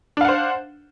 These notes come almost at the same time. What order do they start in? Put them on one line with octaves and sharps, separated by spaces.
D4 F5 F#5 C5